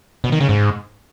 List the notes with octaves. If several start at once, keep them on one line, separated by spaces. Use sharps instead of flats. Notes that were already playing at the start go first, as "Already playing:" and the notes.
B2
D#3
C#3
G#2